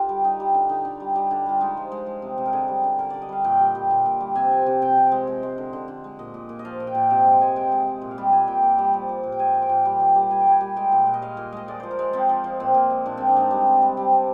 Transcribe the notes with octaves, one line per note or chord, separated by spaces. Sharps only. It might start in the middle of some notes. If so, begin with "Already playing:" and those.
Already playing: D3 F4 G4 A#4
G3
G3 D#4
G3
D3
D3 D#4
D3
G3
G3
D3
G3 F4
G#3 D#4
F3
G#3
G#3
C3
C3
A#4
D3 G#4
G3
D3
D3 A#4
D3 D5
D#5
G3 F5
A#2 G5
G3
G3
A#2
A#2
G3
C3 G#5
F3
C3
C3 G5
C3
G#3
G#3
G#3
D3
D3
D3
G#3
A#2 D#5
A#2
A#2
D#5
F3 F5
A#2
G5
A#2
C3 G5
G#3
G#3 G#5
G#3 G5
G#3
G#3
A#2
F5
G3 G5
A#2 G#5
A#2 G5
A#2
G3
F3
F3
A#2
G5
G#3 G#5
F3
G5
A#2
G3
G3
G3
G3 G#5
G5
G3 G#5
G3
G#3 G5
A#2
A#2
D#5
G#3 F5
A#2
G#3 D#5
G#3 D5
F3 C5
A#4
G#3
F3 C4
F3
F3
A#2 C4
A#2
G#3
A#2 D4
G#3 C4
D4
G#3 D#4
G3 D4
C3
G3
G3 C4
C3